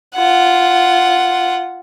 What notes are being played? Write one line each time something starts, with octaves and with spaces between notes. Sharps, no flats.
F4 F#5